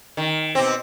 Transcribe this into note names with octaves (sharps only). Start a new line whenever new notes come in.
D#3
B2 C4